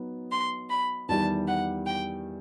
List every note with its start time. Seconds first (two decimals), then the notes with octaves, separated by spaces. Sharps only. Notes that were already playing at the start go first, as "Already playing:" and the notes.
Already playing: F#3 B3 D#4
0.31 C6
0.69 B5
1.08 E2 D#3 G3 A5
1.47 F#5
1.86 G5